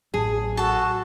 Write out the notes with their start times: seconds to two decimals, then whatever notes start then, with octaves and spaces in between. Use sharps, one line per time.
0.14 A1 A2 F#3 G#4
0.57 F#4 A4 A5